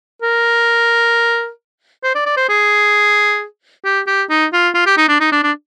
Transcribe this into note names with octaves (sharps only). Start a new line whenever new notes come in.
A#4
C5
D5
D5
C5
G#4
G4
G4
D#4
F4
F4
G4
D#4
D4
D#4
D4
D4